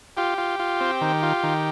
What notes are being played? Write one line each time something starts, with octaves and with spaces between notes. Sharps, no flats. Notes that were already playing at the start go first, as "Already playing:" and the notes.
F4 G4
F4
F4
C4
D#3
F4
D#3